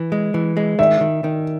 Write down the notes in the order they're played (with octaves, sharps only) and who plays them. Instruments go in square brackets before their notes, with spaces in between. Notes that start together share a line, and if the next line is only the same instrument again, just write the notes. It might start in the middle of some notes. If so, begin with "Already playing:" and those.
Already playing: [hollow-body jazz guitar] E3
G#3
E3
G#3
[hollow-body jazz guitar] D#3 [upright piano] E5
[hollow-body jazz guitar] D#3
D#3